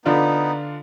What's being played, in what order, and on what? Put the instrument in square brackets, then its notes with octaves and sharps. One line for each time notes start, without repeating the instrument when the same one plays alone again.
[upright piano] D3 D4 F4 [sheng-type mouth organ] B3 D#4